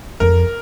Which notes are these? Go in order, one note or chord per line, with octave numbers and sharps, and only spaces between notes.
F2 A#4